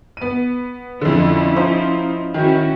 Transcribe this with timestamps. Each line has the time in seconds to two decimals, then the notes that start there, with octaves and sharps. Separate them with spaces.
0.17 B3 D#7
1.01 F2 D3 F3 C#4 E4
1.56 D#4 F4 C5
2.34 D#3 C#4 E4 F#4